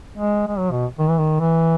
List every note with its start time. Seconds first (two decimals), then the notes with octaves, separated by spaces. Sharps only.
0.18 G#3
0.48 G#3
0.58 F#3
0.71 B2
0.99 D#3
1.09 E3
1.18 D#3
1.40 E3